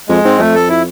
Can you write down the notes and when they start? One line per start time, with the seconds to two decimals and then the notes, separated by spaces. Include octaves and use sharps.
0.09 F2 G#3
0.24 G#2 C4
0.39 F2 A3
0.55 A4
0.69 E4